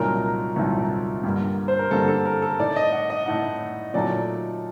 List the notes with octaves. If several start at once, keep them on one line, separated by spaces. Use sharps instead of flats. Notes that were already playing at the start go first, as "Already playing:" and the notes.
Already playing: C2 A#2 F#3 A3 D#4 A#4
C2 A#2 F#3 A3 D#4
G2 D3 G3 A#3
C5
A#4
G2 D3 G3 A#3 A4
A4
A#4
A4
A2 A3 D#4 D5
D#5
F#5
D#5
A2 A3 D#4 F#5
A#2 F#3 A3 D#4 A4 D5